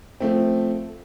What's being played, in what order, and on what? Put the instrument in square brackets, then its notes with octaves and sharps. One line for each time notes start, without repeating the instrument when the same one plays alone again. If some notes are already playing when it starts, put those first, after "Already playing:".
[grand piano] F3 A3 C4